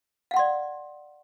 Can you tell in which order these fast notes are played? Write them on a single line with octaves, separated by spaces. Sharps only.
F5 F#5 C6 D5